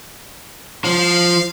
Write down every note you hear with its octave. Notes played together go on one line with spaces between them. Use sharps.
F3 F5